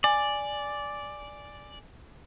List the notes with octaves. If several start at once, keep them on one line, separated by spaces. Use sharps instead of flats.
D5 G#5